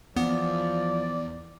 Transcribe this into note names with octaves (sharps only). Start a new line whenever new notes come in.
E2 F3 B3 D5